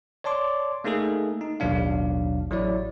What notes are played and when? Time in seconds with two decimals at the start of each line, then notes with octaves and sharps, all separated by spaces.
0.24 C#5 D5 A5 C6 D6
0.84 A3 A#3 D#4 G#4 A4
1.41 D#4
1.60 A1 D#2 B2 F#3 D4 F5
2.50 A1 F#3 E4 C#5 D5